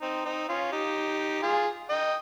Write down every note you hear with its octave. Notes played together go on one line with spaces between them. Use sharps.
C4 D#4
C4 D#4
C#4 F4
D#4 G4
F4 G#4
D#5 G5